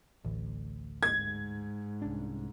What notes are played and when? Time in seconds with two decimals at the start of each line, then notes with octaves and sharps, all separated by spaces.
0.25 A1 D2
1.03 G#2 G#6
2.02 C2 C#4 D4